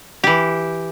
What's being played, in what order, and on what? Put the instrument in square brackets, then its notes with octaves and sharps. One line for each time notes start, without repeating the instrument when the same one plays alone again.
[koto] E3 G4